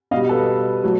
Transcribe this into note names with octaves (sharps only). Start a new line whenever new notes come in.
B2 G3 D#5 F5
A4 B4
F#3 A3